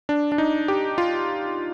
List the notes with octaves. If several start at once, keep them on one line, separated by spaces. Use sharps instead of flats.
D4
D4
D#4
G4
F4